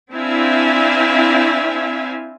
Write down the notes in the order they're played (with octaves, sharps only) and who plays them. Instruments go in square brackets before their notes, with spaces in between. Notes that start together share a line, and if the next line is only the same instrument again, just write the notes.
[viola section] C4 D4 E4 E5 F5 G#5